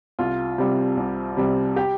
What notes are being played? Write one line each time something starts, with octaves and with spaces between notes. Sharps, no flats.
C2 F4
C3 G3
C2
C3 G3
G4